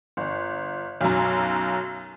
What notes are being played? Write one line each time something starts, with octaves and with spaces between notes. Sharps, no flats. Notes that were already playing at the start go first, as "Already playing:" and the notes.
G1
B1 F#2